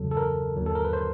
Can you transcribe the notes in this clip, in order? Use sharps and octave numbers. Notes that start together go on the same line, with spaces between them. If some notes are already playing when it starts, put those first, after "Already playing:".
Already playing: E2 C#3 F#3 A4
A4
A#4
D#2 D3 F#3
A4
A#4
B4
C5